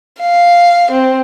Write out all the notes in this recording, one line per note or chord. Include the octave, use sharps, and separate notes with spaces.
F5
C4